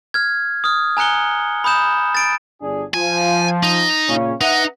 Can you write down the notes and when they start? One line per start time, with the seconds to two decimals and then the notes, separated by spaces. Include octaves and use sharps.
0.14 F6 G#6
0.64 D#6 F6
0.97 G#5 A#5 F#6 C#7 G7
1.64 B5 D#6 G6 E7
2.15 A6 D7
2.62 G1 D4 G#4
2.94 F3 G#5
3.63 D#4
4.08 A#2 C#3 C#4
4.41 D#4 B4 E5 F#5